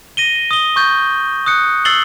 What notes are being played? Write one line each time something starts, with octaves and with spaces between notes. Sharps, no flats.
A#6 D#7 G7
D#6 G7
C#6 G6 A6
D#6 F#6 C#7
E6 A6 C7 F#7 G7